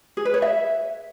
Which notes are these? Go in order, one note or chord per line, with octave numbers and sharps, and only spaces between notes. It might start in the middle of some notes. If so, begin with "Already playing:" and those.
G#4
B4
C#5
E5